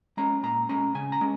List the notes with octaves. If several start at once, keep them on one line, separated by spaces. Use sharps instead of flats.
G#3 C#4 A#5
A#2 A#5
G#3 C#4 A#5
C#3 G#5
A#5
G#3 C#4